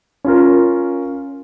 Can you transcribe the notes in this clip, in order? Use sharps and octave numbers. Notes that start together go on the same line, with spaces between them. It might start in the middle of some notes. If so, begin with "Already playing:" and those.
C#4 F4 A#4